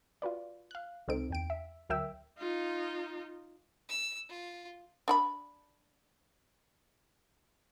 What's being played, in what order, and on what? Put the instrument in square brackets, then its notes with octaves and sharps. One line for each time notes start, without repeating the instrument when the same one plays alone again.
[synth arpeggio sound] F4 F#4 B4 D5
F5 F#6
C#2 C3 C4 D#4 A4 D7
E2 G5 D7
E5
D2 F#3 A#4 E5 G5 E6
[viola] D#4 F4
[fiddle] E6
F4
[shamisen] D4 F#5 B5